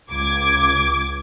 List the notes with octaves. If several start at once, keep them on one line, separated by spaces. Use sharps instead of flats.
C#2 D6 G#6